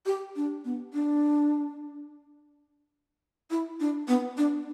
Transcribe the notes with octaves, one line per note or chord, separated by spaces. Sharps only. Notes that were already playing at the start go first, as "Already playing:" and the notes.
G4
D4
B3
D4
E4
D4
B3
D4